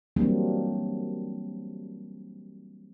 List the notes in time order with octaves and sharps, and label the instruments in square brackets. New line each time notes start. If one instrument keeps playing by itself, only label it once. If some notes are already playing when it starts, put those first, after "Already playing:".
[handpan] E3 F#3 G3 A#3 C4 D4